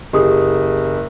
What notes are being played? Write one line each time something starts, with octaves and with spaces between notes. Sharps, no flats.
F#1 G4 G#4 D#6